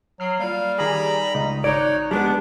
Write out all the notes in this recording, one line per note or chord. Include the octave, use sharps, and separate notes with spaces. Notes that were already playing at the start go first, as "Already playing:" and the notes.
F#3 F6 C7
G3 A#3 F4 F5
D#3 G4 G#4 A#5 B5
C#2 D#4 D#5
G#1 D#4 C#5 D5 C#6 F#6
G3 G#3 B3 D4 D6